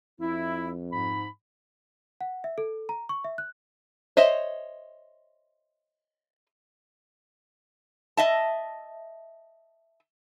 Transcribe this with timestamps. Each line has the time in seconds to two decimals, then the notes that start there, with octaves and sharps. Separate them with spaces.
0.20 F2 E4
0.92 G#2 B5
2.21 F#5
2.44 E5
2.58 A4
2.89 A#5
3.09 C#6
3.24 E5
3.38 F#6
4.17 C5 C#5 D#5 E5
8.17 D#5 E5 A5